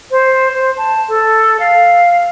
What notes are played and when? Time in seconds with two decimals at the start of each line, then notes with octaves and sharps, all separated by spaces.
0.11 C5
0.53 C5
0.77 A5
1.09 A4
1.60 F5